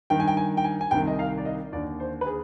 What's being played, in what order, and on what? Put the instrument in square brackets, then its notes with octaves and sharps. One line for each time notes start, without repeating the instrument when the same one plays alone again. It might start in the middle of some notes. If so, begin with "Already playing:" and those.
[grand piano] G2 D#3 G5
G#5
G5
G#5
G5
G#5
G#5
C2 C3 D#3 G5
D#5
F5
D5
D#5
D#2 D5
D3
C5
B4
G#4